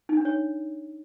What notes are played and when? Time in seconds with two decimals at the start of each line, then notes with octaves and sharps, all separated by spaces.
0.09 D#4
0.17 D4
0.25 C#5